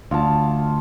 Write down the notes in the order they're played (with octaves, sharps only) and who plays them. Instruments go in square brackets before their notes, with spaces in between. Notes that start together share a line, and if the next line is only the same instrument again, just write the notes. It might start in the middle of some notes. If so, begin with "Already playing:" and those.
[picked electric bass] D2 [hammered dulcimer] F4 A5